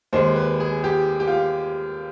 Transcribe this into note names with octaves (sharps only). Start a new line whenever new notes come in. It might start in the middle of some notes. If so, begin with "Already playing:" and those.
D#2 D#3 G#3 C5
B4
G#4
G4
G4
F4